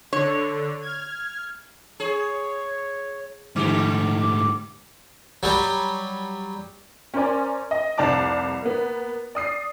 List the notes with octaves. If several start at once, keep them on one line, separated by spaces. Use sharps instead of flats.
D3 C#5
F6 G#6
G#4 C#5
G#2 D3 A3 G4 D6
F#3 G3
C#4 A#4 C5 D5 G#5
D#5
F1 C2 D5 A5 D6
A#3 B3
D5 D#6 C7